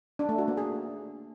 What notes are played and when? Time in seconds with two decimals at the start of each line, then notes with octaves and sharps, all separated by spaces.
0.19 D4
0.29 A3
0.38 F#4
0.48 A#3
0.57 G#4